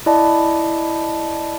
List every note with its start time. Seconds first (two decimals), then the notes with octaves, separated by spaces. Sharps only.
0.06 E4 D5 D#5 A5